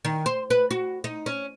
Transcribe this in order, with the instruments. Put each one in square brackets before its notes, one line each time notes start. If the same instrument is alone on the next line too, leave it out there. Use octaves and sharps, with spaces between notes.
[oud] D#3
C5
B4
F#4
D#4
C#4